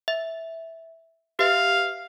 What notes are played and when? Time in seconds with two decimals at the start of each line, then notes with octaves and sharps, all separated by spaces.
0.08 E5
1.39 G4 B4 E5 F5